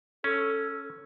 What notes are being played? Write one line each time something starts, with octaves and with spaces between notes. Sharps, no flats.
C#4 A4